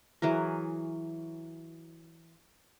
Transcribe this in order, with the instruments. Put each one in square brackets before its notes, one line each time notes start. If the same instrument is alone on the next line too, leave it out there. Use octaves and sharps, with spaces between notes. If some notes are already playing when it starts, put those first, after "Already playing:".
[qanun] E3 F#3 G#4 A#4